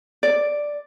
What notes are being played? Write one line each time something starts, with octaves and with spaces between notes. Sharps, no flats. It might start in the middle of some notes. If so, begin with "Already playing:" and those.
D5